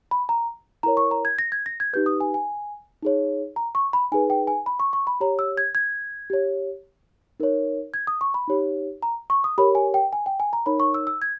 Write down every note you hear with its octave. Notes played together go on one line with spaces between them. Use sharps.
B5
A#5
E4 A#4 C#5 A#5
C#6
A#5
G#6
A#6
G#6
A#6
G#6
D#4 G4 B4 G6
D#6
G#5
G#5
D#4 G#4 C#5
A#5
C#6
B5
D#4 G#4 B4 G#5
G5
G#5
B5
C#6
C#6
B5
G4 C#5 A#5
E6
G#6
G#6
G4 C#5
D#4 A#4 C#5
G#6
D#6
C#6
B5
D#4 G4 C#5
A#5
C#6
D#6
G4 A#4 C#5 B5
G#5
G5
G#5
G5
G#5
A#5
D#4 A#4 C#5 B5
C#6
E6
E6
G#6